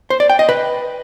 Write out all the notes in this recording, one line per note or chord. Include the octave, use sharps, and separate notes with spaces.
C5
D5
G5
D#5
B4